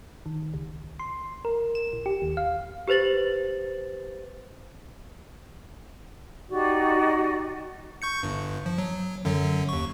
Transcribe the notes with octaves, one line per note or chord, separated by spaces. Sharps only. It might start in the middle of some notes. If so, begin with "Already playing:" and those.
D#3
C#2
C6
A#4
E7
A#1
G4
D#2
F5
G4 B4 C5 A6 F#7
D#4 F#4 G4 D5
C#6 G6 C#7
G1 G2
F3
F#3
F#2 D3 F#3
D#2 C#6